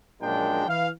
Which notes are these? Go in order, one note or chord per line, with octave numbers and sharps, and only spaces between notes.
A#1 F#2 A#2 G#3 D4 G5
E3 F5